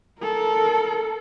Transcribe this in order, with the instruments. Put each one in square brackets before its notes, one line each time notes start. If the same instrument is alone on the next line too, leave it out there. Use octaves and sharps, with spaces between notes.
[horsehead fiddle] A4 A#4